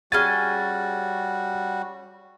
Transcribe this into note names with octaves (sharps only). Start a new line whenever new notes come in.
G3 C#4 F#4 G#4 G#5 A6